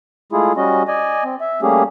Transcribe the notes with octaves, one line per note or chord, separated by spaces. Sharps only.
G#3 A3 E4 F4 G#4
G3 C#4 F#4 D#5
D5 D#5 G#5
C4
E5
G3 A3 A#3 C#4 G4 G#4